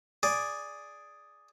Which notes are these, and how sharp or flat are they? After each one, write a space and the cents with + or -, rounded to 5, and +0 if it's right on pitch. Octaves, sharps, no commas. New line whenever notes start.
G#4 +0 D5 +0